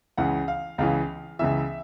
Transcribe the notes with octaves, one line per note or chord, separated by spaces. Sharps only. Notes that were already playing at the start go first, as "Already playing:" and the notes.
C#2 C#3 E3 F#5
F5
C#2 C#3 E3 F5
C#2 C#3 E3 E5